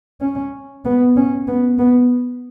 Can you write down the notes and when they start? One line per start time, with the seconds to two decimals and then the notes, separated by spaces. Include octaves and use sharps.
0.21 C#4
0.85 B3
1.16 C#4
1.47 B3
1.79 B3